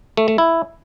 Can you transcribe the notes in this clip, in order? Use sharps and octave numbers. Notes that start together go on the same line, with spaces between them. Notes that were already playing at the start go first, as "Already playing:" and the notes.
A3
A3
E4